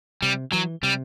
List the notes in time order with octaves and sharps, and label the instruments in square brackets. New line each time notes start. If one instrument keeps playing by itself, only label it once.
[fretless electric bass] C3 [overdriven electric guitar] G3
[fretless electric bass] E3 [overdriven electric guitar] F#3
[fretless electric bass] C3 [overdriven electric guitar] G3